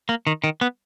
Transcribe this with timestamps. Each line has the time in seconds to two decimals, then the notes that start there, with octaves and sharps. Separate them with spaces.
0.09 A#3
0.27 D#3
0.44 D#3
0.61 B3